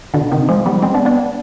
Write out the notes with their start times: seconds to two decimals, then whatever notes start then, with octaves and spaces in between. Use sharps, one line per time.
0.14 B2 D3
0.32 C3 D#3
0.49 F3 G#3
0.66 G3 B3
0.82 G#3 C4
0.94 B3 D4
1.05 B3 D4